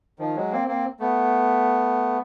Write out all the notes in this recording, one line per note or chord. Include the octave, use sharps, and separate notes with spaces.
D#3 F3
F#3 G#3
A#3 C4
A#3 C4
A3 B3